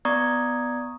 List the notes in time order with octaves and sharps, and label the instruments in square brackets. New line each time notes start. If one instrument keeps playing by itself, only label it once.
[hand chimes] B3 D5 A#5 C#6 D#6 G#6